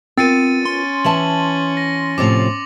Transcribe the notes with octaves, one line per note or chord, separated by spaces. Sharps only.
B3 C4 F4 A#4 A6 C#7 D#7
C#4 C6
E3 E5 A5 F#7
A#6
A2 C3 F3 D6 F7